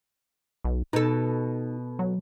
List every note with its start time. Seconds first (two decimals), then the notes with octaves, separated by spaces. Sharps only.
0.64 B1
0.93 B2 D#4 A4
1.99 F#3